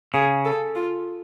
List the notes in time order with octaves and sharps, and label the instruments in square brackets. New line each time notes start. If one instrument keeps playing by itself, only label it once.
[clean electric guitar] C#3 [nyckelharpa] G#4
[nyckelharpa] A4
F4